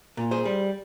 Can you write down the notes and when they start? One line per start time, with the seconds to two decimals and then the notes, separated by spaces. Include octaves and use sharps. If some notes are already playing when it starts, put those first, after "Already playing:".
0.17 A#2
0.31 G#4 C5
0.45 G3